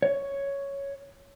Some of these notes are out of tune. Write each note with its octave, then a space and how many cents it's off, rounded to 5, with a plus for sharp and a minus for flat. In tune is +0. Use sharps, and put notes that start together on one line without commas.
C#5 +5